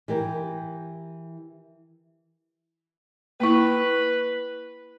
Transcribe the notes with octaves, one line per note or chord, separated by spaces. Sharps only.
E3 G4 A#4
A#3 E4 B4